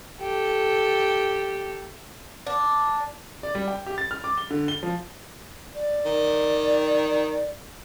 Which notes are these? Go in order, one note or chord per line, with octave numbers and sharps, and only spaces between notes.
G4 A4
D4
D5
G3
G5
G4
A6
F6
D6
G7
D3
G7
F3
D5
D#3